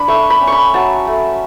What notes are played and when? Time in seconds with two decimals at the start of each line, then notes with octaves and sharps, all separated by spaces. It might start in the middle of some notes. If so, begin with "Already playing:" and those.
Already playing: D4 B5
0.08 A3 C#6
0.30 B5
0.41 C#4
0.47 B5 C#6
0.74 F#3 A5
1.07 A3